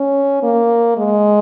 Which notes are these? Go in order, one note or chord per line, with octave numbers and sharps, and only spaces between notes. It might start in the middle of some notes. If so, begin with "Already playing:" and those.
Already playing: C#4
A#3
G#3